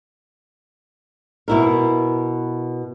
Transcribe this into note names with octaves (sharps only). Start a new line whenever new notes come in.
B2 E4 A#4